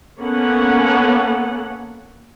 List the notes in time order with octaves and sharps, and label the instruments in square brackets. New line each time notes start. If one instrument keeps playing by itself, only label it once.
[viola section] A#3 B3 C#4 A4 F#5